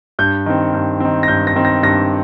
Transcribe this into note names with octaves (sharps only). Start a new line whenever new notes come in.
G2 G6
D#3 C4
G2
D#3 C4
A#6
G2 G6
A#6
D#3 C4
A#6
G2 A#6